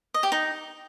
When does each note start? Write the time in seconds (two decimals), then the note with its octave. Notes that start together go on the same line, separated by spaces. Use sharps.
0.14 D#5
0.23 G4
0.32 D#4